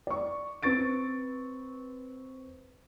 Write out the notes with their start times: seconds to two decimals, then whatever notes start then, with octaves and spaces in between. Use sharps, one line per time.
0.07 D5 C#6
0.63 C4 B4 C#6 A6 D7